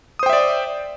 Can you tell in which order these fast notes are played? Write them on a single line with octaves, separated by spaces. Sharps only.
D#6 C5 G5 E5 D5